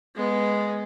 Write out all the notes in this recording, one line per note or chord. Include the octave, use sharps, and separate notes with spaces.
G#3 B3